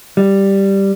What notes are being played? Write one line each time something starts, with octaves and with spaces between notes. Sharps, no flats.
G3